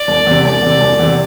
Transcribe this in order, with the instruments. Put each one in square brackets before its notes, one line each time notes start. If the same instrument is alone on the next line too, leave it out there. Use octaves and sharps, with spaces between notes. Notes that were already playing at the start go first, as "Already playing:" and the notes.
Already playing: [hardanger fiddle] D5
[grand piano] E1
E2 C3
[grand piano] E1 [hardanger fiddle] D5
[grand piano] E2 C3
E1
E2 C3